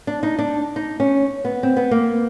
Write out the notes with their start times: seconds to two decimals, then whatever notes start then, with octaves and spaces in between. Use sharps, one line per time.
0.07 D4
0.23 D#4
0.39 D4
0.76 D#4
1.00 C#4
1.45 B3
1.63 C4
1.76 B3
1.91 A#3